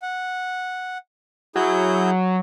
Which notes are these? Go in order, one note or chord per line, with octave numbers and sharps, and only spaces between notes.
F#5
F#3 E4 G#4 G6